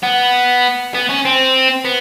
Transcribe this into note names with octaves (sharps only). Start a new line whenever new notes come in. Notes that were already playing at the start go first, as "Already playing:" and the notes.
B3
B3
C#4
C4
B3